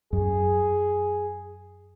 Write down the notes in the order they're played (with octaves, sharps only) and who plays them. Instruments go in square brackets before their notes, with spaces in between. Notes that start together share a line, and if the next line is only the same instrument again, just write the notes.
[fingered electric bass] F#2 [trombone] G#4